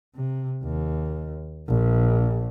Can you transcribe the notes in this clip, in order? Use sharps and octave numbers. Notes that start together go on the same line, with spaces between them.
C3
D#2
A#1